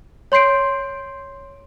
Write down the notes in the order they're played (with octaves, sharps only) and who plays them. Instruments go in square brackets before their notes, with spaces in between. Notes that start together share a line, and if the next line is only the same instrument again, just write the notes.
[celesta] C#5 C6 G6 C7 D7